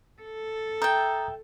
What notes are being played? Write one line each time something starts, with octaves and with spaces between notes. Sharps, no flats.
A4
E5 G5 A#5 D#6 G6